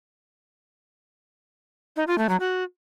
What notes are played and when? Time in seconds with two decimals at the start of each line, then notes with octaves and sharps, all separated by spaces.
1.96 D#4
2.07 F4
2.18 A3
2.29 F#3
2.40 F#4